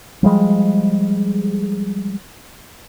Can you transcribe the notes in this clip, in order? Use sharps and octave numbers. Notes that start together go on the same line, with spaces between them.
F3 G3 G#3